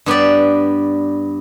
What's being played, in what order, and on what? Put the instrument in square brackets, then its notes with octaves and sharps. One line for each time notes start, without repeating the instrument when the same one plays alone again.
[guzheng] G2 B3 G4 D5